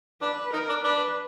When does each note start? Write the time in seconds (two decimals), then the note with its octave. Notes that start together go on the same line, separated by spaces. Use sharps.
0.22 D4 B4
0.53 D#4 A#4
0.69 D4
0.84 D4 B4